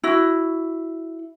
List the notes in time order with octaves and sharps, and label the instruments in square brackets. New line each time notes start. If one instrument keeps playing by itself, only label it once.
[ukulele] E4 F#4